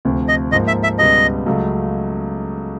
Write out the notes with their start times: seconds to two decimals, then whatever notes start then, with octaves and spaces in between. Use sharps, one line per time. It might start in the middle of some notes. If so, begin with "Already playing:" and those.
0.05 D2 C3 F3
0.28 D#5
0.52 G#2 F3 A#3 D#5
0.67 E5
0.83 E5
0.99 C#2 B2 G3 B3 D#5
1.46 C#2 C#3 F#3 A3